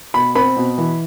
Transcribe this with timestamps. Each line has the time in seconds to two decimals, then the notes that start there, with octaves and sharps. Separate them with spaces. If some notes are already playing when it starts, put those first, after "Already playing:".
0.14 B2 B5
0.35 C4 B5
0.56 B2
0.78 E3